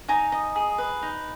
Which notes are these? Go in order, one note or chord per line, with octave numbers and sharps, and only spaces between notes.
D#4 G#5 A#5
D#5
G#4
B4
D#4